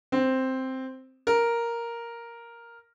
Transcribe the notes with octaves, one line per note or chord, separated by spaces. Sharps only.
C4
A#4